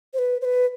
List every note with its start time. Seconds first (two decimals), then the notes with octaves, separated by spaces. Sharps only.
0.14 C5
0.19 B4
0.41 C5
0.45 B4